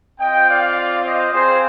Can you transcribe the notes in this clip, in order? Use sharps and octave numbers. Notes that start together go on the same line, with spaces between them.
C4 F4 D#5 G5
D5 F5
C5 D#5
C4 F4 G#4 C5